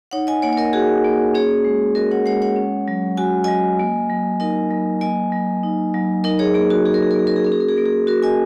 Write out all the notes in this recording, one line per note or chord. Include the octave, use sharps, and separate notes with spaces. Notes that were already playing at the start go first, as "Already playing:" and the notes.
D#4 C#5 F#5
D#5 G#5
A#3 C#5 F#5
C#5
A#4 D#5
F#4 G#4
A#3
C#4 G#4 C#5
G#3
F#4 A#4 D#5
C#5 F#5
G#3 C#5 F#5
C#5 F#5
C#4
F#3
F#4 G#5
F#3 D#5 G#5
A#3
F#3
D#4 A#4 D#5
F#3
A#3 D#5 G#5
F#3
D#4
F#3
D#4 A#4 D#5
G#4 C#5
A#3 G#4
F#4
F#4 G#4
A#4
G#4
A#4
A#3 G#4
A#4
G#4
C#4 A#4
G#4
A#4
G#4
A#3 A#4
G#4
F#4 A#4
D#5 G#5